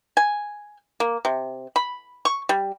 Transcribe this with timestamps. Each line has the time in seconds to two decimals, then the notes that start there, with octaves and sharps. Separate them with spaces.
0.17 G#5
1.00 A#3
1.25 C3
1.76 B5
2.25 C#6
2.49 G3